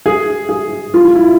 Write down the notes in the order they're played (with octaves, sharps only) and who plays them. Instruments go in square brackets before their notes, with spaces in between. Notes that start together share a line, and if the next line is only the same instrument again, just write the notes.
[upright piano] G#4
G#4
F4
F4
E4